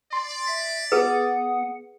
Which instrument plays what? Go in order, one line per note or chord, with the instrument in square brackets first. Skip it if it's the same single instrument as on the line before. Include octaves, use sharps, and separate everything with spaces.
[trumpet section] D5 [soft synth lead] C6
[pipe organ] E5
[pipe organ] B3 F#5 [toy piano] G#4 B4 [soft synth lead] D#6